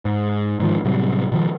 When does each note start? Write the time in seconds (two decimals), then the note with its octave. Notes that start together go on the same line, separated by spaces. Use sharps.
0.05 G#2
0.60 G#2 D#3 F3
0.85 A2 C3 F#3 G3
1.32 B2 D#3 F3